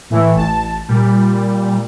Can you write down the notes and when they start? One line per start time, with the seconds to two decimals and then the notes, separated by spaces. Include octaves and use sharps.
0.10 A2 E3 A3
0.35 A1 A5
0.89 A#2 G3